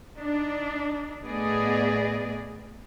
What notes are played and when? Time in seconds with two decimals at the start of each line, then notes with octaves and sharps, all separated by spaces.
0.17 D4 D#4
1.24 A2 A3 B3 G#4 D5 D#5